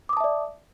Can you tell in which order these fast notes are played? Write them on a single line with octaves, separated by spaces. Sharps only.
D6 D#6 A5 E5 D5